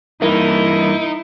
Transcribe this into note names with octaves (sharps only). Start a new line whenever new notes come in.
G2 E3 A#3 D#4 E4